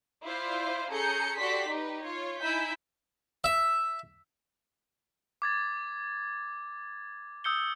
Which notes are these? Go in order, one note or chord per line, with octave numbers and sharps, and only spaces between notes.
E4 F4 C5 D5 F5
C#4 G#4 A4 A#5 G6 C#7
F#4 G4 A4 D5 C6 B6
D#4 G4 B4
F4 C#5
D#4 E4 G#5 E6 G6 B6
E5
D6 G#6 A6
D#6 E6 G6 C#7 G7